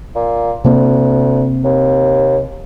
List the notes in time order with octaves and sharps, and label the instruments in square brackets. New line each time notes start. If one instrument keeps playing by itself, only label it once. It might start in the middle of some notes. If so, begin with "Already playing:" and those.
[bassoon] A#2
[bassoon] D2 [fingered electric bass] C3 A#3 C4
[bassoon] D#2